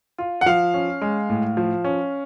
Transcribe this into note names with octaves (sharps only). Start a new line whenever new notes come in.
F4
F#5
F3 F5
C#4
G#3
A2
F3
C#4